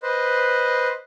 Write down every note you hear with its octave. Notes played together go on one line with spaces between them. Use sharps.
B4 C5 D#5